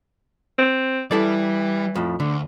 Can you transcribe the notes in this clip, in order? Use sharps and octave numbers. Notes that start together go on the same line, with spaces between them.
C4
E3 G3 E4 A4 D5
F2 A2
D2 D3